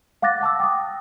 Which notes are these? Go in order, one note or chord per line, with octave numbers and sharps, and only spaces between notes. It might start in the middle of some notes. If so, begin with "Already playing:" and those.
F5 F#5 D6 F#6 A6 A#6
F#5 A5 D6 E6
G5 D#6